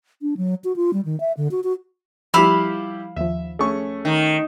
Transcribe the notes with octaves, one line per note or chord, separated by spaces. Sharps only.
D4
F#3
F#4
F4
G3
D#3
E5
D3
F#4
F#4
F3 G3 E4 G4 F5 B5 E6
D#2 F3 E5
A3 C#4 G#4 C#6
D#3